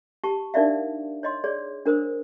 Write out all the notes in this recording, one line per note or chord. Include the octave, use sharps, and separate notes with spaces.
G4 A5 C#6
D4 D#4 A#4 D5 E5 F5
C#5 D#5 C6
G#4 C#5 D5
D4 A#4 C5 D#6